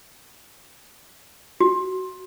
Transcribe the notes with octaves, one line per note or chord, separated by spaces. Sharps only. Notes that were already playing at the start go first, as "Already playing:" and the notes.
F#4